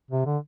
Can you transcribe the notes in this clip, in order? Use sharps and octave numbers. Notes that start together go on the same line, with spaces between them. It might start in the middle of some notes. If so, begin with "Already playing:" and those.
C3
D3